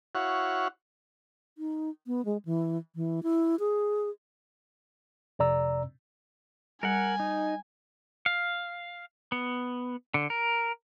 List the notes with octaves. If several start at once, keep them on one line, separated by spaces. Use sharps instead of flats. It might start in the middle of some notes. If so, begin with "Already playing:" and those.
E4 F#4 C#5 F5 F#5
D#4
B3
G#3
E3
E3
E4
G#4
F2 C3 D5 A#5 E6
G3 A#4 F#5 G#5
D#4
F5
B3
D3
A#4